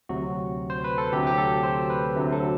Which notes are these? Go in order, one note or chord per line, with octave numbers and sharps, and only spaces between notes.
D2 C3 F#3 F#4
C5
B4
A4
D2 C3 F#3 G4
G4
A4
C5
B4
D2 C3 F#3
A4